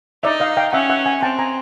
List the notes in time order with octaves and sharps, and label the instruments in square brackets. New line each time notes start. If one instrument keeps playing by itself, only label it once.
[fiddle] D#4 [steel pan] D5 E5
[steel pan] D#5 F5
F5 G5
[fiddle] C#4 [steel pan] E5 F#5
[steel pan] E5 F#5
F#5 G#5
[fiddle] C4 [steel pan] G5 A5
[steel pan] G#5 A#5